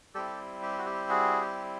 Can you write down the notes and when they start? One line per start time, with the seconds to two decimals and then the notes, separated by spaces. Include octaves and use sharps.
0.14 G3 C4 E4 G4 A4
0.62 G4
0.78 F#4
0.85 G4
1.09 F#4 G#4
1.41 G4